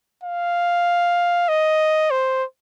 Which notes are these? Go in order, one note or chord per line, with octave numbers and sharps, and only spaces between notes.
F5
D#5
C5